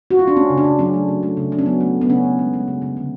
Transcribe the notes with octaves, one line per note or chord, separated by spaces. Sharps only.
F#4
F4
D4
A3 C#4
C#3
D4
C#3
F#3 C#4
A3
C#3
A3
C#3
C#3 D4
C#4
F#3 B3
A3
C#3
B3
C#3 C#4
C#3
G#3
G#3
C#3
C#3
D3